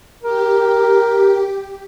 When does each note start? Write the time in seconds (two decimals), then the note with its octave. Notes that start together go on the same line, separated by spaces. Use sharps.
0.23 G4 A#4